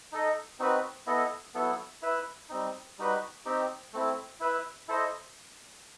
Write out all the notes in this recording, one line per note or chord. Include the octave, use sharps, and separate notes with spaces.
D#4 A4 D#5
C4 D#4 F#4 B4
B3 E4 A4 D#5
F#3 B3 E4 A4
E4 B4 E5
G3 C4 D#4
G3 D#4 F#4 B4
C4 D#4 G4
A3 C4 E4
E4 B4 E5
E4 A4 C5 D#5